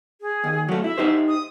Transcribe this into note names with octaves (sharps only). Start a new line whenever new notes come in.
G#4
D#2
F#3 A3
E4 E5
D#4 G4 C5
D#6